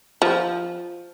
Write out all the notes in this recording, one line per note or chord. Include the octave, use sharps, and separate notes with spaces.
F3